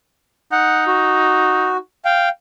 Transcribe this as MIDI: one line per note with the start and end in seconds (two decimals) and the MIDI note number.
0.52 1.78 63
0.52 0.84 78
0.87 1.77 66
2.05 2.29 77
2.05 2.29 79